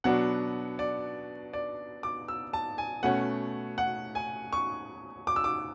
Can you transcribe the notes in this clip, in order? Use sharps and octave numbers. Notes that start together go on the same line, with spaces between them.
B2 F#3 B3 D4 F#5
D5
D5
D6
E6
A5
G#5
B2 A3 C#4 F#5
F#5
G#5
C#6
D6
E6
D6